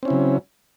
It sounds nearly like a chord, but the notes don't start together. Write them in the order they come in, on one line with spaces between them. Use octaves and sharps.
C4 C#4 E4 C#3 F#3